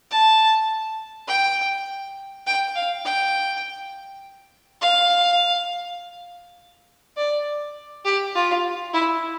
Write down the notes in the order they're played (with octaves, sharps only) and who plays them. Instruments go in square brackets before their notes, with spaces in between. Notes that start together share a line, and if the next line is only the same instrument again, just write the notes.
[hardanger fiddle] A5
G5
G5
F5
G5
F5
D5
G4
F4
E4